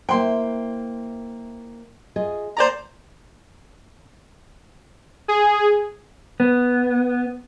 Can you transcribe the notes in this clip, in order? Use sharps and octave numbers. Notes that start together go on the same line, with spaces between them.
A#3 E4 C5 G5 C6
F4 G#4 D#5
C5 D5 A#5
G#4
B3